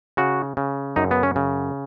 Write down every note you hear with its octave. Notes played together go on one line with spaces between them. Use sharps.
C#3 F#4
C#3
F#2 D#4
B3
C#4
C#3